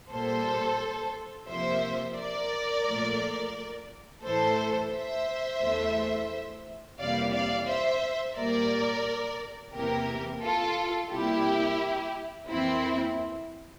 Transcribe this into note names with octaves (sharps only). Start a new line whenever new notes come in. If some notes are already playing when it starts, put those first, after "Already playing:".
A#2 G3 A#3 A4 C5
C3 F3 A#3 C5 E5
A#4 D5
A#2 F3 A3
A2 E3 A3 A4 C5
C5 E5
E2 E3 A3
F2 C3 E3 G3 A#3 D5 F5
D5 F5
C5 E5
A#2 G3 A#3 A#4 D5
E2 C3 E3 A#3 G4 A#4
F4 A4
C3 G3 A#3 E4 G4
F2 E3 A#3 C4 E4